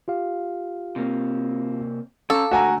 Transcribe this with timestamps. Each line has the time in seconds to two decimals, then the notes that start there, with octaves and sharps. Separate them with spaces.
0.08 F4 G4 F5
0.96 C3 A#3 C4
2.30 C#4 A4 F5 A#5 D6 E6
2.51 D3 G#3 A3 F#4 G#5 A#5